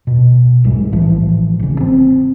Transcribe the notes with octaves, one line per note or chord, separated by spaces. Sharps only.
B2
B1 G#2 G3 G#3
A1 E3 F3
G#1 C#3
C4